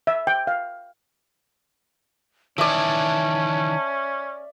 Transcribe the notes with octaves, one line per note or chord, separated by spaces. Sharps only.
E5
G5
F5
D#3 E3 C#4 D5 E5 A5